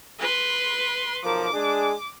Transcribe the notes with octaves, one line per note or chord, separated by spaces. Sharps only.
B4 C6
B1 F3 A#4 D6
G#3 D4 G#4